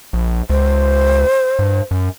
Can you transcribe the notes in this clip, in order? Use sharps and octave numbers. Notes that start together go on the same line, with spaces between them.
A#1
C#2 C5
G2
F#2